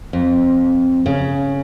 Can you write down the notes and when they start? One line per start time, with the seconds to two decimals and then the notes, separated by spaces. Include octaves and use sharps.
0.13 F2
1.06 C#3